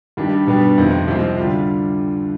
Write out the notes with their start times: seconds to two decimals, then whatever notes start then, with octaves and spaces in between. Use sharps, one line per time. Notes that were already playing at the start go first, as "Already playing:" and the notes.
0.17 G2 D#3 G3 D4 G4
0.47 B2 G3 B3 D4 G4
0.77 F2 C3 D#3
1.08 C2 C3 F3 G#3 C4
1.38 D3 G3 D4 F4